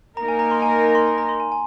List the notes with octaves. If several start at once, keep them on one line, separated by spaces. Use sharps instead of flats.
A#3 D#4 A#4 A#5
G#5
A#5
C6
G#5
A#5
A#5
C6
A#5
A#5
C6
G#5
G#5